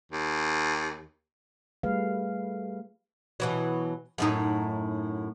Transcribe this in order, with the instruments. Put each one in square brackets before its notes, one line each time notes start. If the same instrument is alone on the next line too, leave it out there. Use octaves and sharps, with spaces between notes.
[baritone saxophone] D#2
[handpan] G3 A3 G#4 B4 F5
[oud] B2 E3 F#3
F#2 A2 D#4